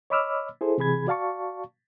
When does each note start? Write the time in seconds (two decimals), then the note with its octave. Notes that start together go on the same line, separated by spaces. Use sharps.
0.10 C#5 D#5 B5 D6 E6 F6
0.61 E4 G#4 A4 C5
0.78 C3 E3 G#4 B5 G#6
1.07 F#4 D5 F5 A5 C#6